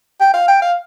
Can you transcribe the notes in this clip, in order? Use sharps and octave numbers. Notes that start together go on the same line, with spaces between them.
G5
F5
G5
F5